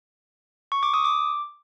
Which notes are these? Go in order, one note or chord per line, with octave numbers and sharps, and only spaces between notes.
C#6
D6
D#6
D6